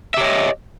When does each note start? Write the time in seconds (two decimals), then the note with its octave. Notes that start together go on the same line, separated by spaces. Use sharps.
0.14 E5
0.18 G4
0.21 C#5
0.24 D#5